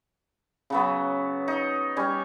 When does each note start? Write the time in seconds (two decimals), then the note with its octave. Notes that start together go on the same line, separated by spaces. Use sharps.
0.70 C#3 F#3 B3
1.48 D#4
1.97 G3 C#4 G#5